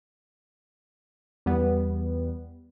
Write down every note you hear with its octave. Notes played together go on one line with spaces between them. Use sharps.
E2 G3 B3